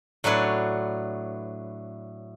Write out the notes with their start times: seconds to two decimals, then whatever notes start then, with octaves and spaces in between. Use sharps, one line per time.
0.24 A2 F#3 D4 B4 C#5